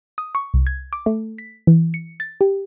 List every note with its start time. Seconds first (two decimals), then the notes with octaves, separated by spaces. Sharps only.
0.18 D#6
0.35 C#6
0.54 C2
0.67 G#6
0.93 D6
1.06 A3
1.38 B6
1.67 E3
1.94 C#7
2.20 A6
2.41 G4